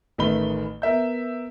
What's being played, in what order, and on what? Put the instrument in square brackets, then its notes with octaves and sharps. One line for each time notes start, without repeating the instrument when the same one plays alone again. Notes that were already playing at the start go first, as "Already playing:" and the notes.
[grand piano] A1 D#3 A3 B4 B5 G7
B3 A#4 E5 G6